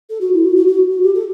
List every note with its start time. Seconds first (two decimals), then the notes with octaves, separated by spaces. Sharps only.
0.09 A4
0.21 F#4
0.33 E4
0.44 F#4
0.56 F#4
0.67 F#4
0.91 F#4
1.03 G4
1.14 A4